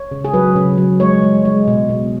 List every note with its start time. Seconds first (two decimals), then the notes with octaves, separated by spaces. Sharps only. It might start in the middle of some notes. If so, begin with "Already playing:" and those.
Already playing: C#5
0.11 C#3
0.25 G#4
0.34 F#3 B4
0.56 C#3
0.78 F#3
1.00 G#3 C#5
1.23 G#3
1.45 G#3
1.68 B2
1.89 B2